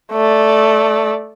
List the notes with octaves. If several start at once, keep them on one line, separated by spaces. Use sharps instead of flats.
A3 D5